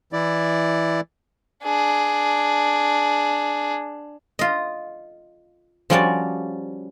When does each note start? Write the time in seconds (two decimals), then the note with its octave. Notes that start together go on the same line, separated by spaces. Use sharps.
0.13 E3 E4 D5
1.64 D4 G#4
4.39 F4 D#5
5.90 F3 G3 C#4 F#4 C#5 D5